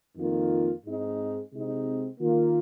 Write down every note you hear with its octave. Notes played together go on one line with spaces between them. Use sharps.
F2 D#3 A#3 F4
G#2 G#3 C4 D#4
C3 G#3 C4 D#4
D#3 A#3 F4